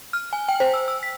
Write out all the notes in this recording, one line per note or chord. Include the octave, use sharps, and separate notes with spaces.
F6
G#5
G5
C5
E6
E6
B6